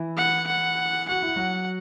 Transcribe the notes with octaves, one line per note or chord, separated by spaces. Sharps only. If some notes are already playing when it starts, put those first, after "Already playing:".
Already playing: E3 E4
F#5
F#5
F#4 F#5
E4
F#3 F#4